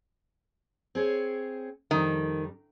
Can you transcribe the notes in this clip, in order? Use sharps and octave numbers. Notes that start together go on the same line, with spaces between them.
C4 G#4 C#5
F2 D#3 G3